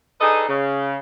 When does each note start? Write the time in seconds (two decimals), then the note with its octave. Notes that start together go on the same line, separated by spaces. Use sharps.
0.21 D4 D#4 G#4 A4 B4 D#5
0.48 C#3